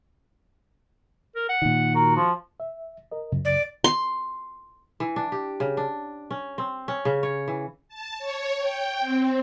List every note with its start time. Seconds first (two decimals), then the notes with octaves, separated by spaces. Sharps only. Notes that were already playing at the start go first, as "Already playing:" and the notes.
1.35 A#4
1.49 F#5
1.62 A#2 D#3
1.95 F#4 A#4
2.16 F3
2.60 E5
3.12 A#4 D#5
3.32 C#2 F#2 C#3
3.45 D5
3.84 C6
5.00 E3
5.16 D4
5.32 G4
5.60 C#3
5.77 D4
6.31 C#4
6.58 C4
6.88 C#4
7.05 C#3
7.23 C#5
7.48 E3
7.89 A5
8.19 C#5
8.58 G5
8.99 C4